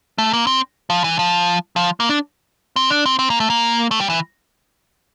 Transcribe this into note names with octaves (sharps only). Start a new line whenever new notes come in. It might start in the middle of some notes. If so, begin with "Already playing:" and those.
A3
A#3
C4
F3
E3
F3
F3
A#3
D4
C4
D4
C4
C4
A#3
A3
A#3
A3
G3
E3